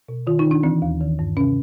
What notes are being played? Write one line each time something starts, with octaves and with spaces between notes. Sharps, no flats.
B2
D#3 F4
D#4
D#3
D4
E3 C4
D#2
D#3
G2
C3 C#4